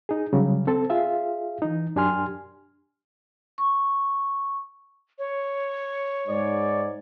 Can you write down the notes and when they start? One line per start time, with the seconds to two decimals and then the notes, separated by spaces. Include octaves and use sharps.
0.09 D#4 G#4
0.33 C#3 F#3 G3
0.67 C4 A4
0.90 F4 G#4 E5 F5
1.62 E3 D#4
1.96 F#2 D4 G4 G#5 C6 F6
3.58 C#6
5.19 C#5
6.28 G#2 D5